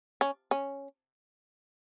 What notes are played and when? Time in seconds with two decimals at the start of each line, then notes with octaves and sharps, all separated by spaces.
0.21 C#4
0.51 C#4